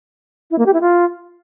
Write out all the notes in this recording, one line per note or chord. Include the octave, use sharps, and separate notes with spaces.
E4
A#3
G4
E4
F4